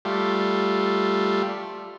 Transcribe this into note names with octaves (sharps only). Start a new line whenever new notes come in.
G3 A3 F4